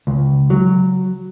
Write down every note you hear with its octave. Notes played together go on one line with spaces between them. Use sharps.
C#2
F#3